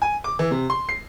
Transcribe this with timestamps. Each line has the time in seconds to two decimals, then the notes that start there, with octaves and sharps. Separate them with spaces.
0.02 G#5
0.24 D6
0.39 E3
0.51 C3
0.70 C6
0.89 C7